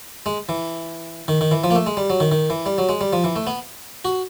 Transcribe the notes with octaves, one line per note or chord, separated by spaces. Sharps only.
G#3
E3
D#3
D#3
E3
F3
A#3
A3
G#3
G3
F#3
D#3
D#3
E3
G3
F#3
G#3
G3
F3
E3
A3
B3
F#4